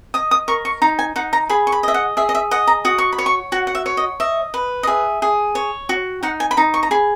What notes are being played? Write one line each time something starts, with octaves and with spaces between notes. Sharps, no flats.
D#5 D#6
D#6
A#4 C#6
C#6
D#4 A#5
G#5
D#4 F#5
A#5
G#4 B5
C#6
B5
D#5 E5
F#5
G#4 E5
D#5
E5
D#5 F#5
A#5
F#4 D#6
C#6
B5
C#5
C#6
F#4 F#5
F#5
E5
C#5
D#5
D#5 E5
B4
D#5
G#4 E5
G#4
C#5
F#4
D#4 F#5
G#5
B5
D#4 A#5
C#6
A#5
G#4 B5